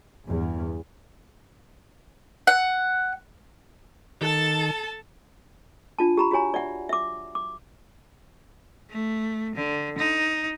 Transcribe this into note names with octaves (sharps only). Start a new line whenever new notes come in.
E2 G2
F#5
D#3 A4 A5
D4 F4 A5
G4 A#5 B5
F#4 G4 C#5 G#5 A#5
D5 E5 F#5
E5 D6
D6
A3
D3
D#4